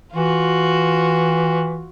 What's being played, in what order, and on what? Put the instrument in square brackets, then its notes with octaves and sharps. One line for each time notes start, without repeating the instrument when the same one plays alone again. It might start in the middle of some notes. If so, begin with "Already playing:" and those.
[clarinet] E3 [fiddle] F4 F#4